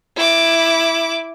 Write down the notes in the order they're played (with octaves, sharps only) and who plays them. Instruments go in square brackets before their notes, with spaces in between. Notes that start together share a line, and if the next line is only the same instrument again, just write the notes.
[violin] E4 D6